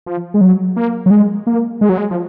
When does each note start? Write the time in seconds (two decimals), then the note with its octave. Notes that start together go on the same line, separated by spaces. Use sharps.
0.06 F3
0.34 G#3
0.41 F#3
0.76 A#3
1.06 F#3
1.11 G#3
1.47 A#3
1.81 G#3
1.89 F#3
1.98 G#3
2.11 F3